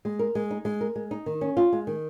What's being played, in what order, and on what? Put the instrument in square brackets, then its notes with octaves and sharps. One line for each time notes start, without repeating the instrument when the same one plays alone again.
[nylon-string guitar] G#3
A#4
G#3
D#4
G#3
A#4
G#3
D#4
D#3
C#4
F4
G#3
D#3